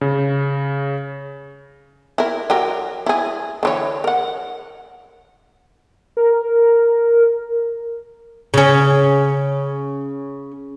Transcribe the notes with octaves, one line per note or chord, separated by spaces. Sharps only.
C#3
E4 A#4
F#3 G4 A#4
E4 G#4
D3 E3 C#5
A#4 F#5
A#4
C#3 C#4